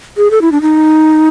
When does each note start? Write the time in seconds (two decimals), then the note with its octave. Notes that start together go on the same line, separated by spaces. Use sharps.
0.17 G#4
0.31 A4
0.41 E4
0.52 D4
0.61 D#4